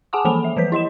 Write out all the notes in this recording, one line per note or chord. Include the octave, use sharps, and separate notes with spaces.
G#4 F#5 G#5 A5 D6 D#6
E3 F3 A#3 A4 B5 F7
E5
E3 F3 B4 B6
E4 D#5 C6 E7